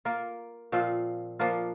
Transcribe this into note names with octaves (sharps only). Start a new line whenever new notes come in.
A#3 F4 A#4
A#2 F3 C4 F4
F3 A#3 D4 F4